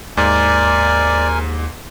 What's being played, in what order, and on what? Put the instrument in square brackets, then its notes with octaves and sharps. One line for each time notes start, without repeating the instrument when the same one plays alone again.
[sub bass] D#2 [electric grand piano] G#2 [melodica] A#4 G#5 [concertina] D5